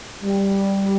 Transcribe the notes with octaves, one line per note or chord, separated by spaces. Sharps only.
G3